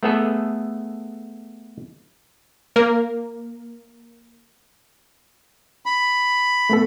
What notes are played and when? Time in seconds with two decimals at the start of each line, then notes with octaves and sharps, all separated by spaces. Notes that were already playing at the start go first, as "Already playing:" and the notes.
0.03 A3 B3 G#4 A4
2.76 A#3 A#4
5.86 B5
6.70 A3 B3 A4